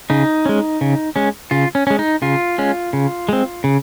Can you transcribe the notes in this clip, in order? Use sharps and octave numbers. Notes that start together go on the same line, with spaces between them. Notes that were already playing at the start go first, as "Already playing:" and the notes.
C#3 D#4
G#3 C#4
C#3
G#3 C#4
C#3 F4
C#4
G#3 C#4
D#4
C#3 F4
G#3 C#4
C#3
G#3 C4
C#3